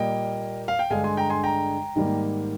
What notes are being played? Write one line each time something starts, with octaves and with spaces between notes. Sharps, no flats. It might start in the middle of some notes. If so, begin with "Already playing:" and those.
Already playing: A#2 G3 A#3 D#5 G5
F5
G5
G2 D3 G#3 F5 G#5
G#5 C6
G5 A#5
G#5 C6
G5 A#5
G#2 D#3 G3 A#3